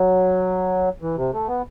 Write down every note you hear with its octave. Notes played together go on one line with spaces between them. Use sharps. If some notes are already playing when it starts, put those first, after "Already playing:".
Already playing: F#3
E3
C3
A3
B3